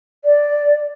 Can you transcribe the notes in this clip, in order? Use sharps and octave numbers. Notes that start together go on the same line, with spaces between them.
D5